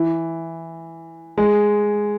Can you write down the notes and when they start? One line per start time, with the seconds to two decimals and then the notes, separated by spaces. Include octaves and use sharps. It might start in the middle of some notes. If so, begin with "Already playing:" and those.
Already playing: E3
1.38 G#3